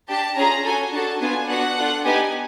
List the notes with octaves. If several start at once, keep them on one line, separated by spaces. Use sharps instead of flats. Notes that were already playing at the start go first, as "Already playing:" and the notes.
D4 G4 A5
C#4 F4 G#4 A#5
C#4 F#4 A4 G#5
D4 F#4 A4 A5
B3 D4 F4 G#5
B3 D4 F#4 F#5
D4 F4 A4
B3 D#4 G4 G#5